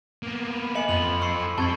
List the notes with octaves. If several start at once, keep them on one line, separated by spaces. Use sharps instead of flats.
A#3 B3
B5
D#5 G#5 C#7 F#7
F2 F4 A4 B5 C6 F#7
C#6 E6 C7 C#7
F2 G4 A5 B5 C#6 G#6 C7